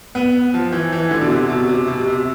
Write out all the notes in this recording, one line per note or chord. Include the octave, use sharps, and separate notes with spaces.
B3
F3
E3
E3
D3
B2
C3
B2
C3
B2
B2
C3